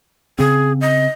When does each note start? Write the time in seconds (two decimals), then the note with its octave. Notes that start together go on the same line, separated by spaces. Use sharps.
0.39 C#3 C4 G#4
0.81 D#5